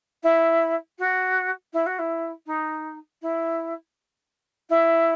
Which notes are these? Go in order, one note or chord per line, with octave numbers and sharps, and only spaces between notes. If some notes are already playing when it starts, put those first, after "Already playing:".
E4
F#4
E4
F#4
E4
D#4
E4
E4